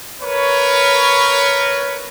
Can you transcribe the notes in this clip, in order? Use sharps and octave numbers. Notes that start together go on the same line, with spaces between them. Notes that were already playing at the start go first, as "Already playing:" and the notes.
A#4 B4 C#5